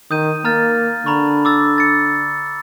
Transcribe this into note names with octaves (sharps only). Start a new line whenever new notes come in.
D#3 D#6 G6 D#7
A#3 A#5 F6 A6
D3 A#5 B5 C#6
D6 E6 A6
A6 C#7